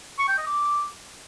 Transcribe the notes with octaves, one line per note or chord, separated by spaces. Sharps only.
C#6
G5
D#5
D6